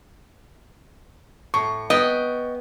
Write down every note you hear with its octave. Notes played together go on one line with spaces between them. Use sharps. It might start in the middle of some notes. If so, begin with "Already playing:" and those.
A2 C#6
B3 D#5 G5